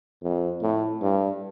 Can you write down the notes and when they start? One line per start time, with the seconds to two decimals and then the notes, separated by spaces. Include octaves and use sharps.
0.22 F2
0.62 A2
1.02 G2